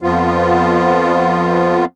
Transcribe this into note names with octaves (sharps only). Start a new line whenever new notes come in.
F2 F3 B3 F4